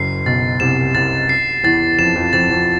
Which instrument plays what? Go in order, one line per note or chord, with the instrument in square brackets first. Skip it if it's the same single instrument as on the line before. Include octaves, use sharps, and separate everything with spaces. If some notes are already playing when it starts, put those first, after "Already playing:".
Already playing: [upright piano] F#1 F#2 [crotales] C7
[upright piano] B1 B2 [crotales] A6
[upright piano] C2 C3 [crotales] E7
[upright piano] C2 C3 [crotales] A6
[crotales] C7
[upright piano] E2 E3 [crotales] A6
[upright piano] F2 F3 [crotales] E7
[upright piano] F2 F3
[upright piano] F2 F3 [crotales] A6
[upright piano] F2 F3